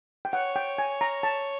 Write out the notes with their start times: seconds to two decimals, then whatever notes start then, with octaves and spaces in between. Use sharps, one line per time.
0.25 G5
0.33 C#5 F#5
0.56 G5
0.78 G#5
1.01 A#5
1.23 A5